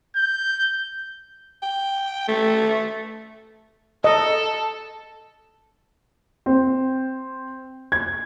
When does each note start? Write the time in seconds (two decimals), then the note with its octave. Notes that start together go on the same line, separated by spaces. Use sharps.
0.16 G6
1.62 G5
2.28 A3
4.04 A4 D#5
6.46 C4
7.92 G#6